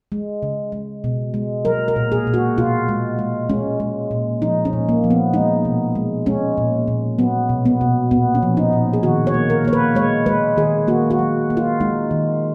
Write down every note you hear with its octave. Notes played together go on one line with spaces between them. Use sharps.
G#3
C#3
G#3
B2
G#3
F#3 A#4
A#4
A#2
G#4
A#2
F#4
B2 F4
G#3
G#3
G#3 C#4
G#3
A#2
F3 D#4
C#4
A#2
A#3
F3
B3
G#3 D#4
B2
G#3
G#3 C#4
A#2
A#2
F#3 B3
B2
B3
B2
A#2 B3
C#4
F3
D#4
A#2
G#4
D#3 F#4
C#5
A#3
A#4
A#3 C#5
B4
G#3 C#5
G#3 B4
D#3 G#4
A#3 F#4
F#4
F#3
A#3
F4
G#3 D#4
D#3